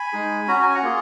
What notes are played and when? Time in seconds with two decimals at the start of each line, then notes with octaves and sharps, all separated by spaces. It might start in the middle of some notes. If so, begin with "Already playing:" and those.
Already playing: G#5 B5
0.13 G#3 D#4 G#4
0.48 C#4 F#4 A#5
0.62 G#5
0.75 F#5 A#5
0.83 A#3 F4 G#4